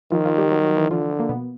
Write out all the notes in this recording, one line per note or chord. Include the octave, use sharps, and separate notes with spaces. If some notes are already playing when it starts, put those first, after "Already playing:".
D#3 F3 F4
F3 F4
G3 G4
F#3 F#4
F#3 F#4
E3 E4
D3 F3 F4
A#3
B2 B3